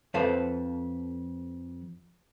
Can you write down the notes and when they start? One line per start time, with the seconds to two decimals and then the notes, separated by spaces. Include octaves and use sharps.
0.14 F2 A4 B4 C5 F5